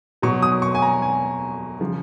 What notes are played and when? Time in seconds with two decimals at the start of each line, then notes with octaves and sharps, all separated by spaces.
0.22 B2 F#3 C#6
0.42 D#6
0.62 C#6
0.75 G#5
0.82 A#5
1.02 G#5
1.80 C#3 F3